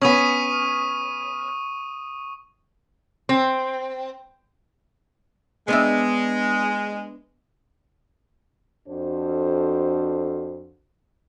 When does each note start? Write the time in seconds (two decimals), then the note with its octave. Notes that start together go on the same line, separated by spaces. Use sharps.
0.02 B3 C#4 C#6 D#6 D#7
3.29 C4
5.68 G#3 B3 D4 E5
8.87 F2 D4 F#4 A4 C5